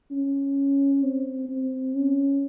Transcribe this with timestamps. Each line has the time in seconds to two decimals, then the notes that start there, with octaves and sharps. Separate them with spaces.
0.11 C#4
1.03 C4
1.49 C4
1.95 C#4